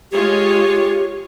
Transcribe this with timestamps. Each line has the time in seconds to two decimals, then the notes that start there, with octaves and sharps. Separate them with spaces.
0.11 G#3 F4 G4 C#5